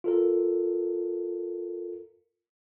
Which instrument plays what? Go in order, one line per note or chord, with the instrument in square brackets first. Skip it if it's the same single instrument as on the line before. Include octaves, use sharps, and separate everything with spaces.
[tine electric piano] F4 A4 A#4